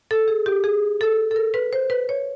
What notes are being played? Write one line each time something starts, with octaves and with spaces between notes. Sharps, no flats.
A4
G#4
G4
G#4
A4
A4
A#4
B4
C5
B4
C#5